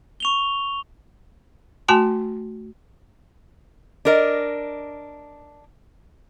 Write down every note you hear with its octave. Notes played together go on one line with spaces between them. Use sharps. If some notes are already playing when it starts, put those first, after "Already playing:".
C#6 F7 G7
A3 F#4 G#5 A5 C6
D4 A#4 D#5